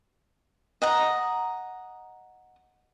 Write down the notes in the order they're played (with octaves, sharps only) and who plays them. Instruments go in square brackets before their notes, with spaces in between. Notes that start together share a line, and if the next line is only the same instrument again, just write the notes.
[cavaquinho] D#5 F#5 A#5